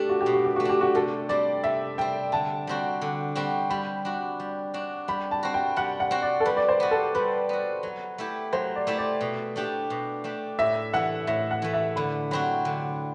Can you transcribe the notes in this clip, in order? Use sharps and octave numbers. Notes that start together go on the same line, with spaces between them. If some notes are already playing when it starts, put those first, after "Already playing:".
Already playing: A3 D4 G4 A4
F#4
G4
B2
F#4
G4
A3 F#4
D4 G4
F#4
C3 A4
G3 C4 D5
C3 E5
G3 C4 G5
D3 A5
G3 C4 F#4
D3
G3 C4 F#4
G3 B5
D4 F#4
G3
D4 F#4
G3 B5
A5
C4 F#4
G5
G3 F#5
F#5
C4 F#4
D5
A4
G3 B4
D5
C5
B3 F#4
A4
G3 B4
B3 F#4
F#3
A3 E4 G4
F#3 C5
D5
A3 E4 G4
D5
B2
A3 D4 G4
B2
A3 D4 G4
A2 E5
E3 A3 F#5
A2 E5
F#5
E3 A3
E5
D3 B5
F#3 C4 F#4 B5
D3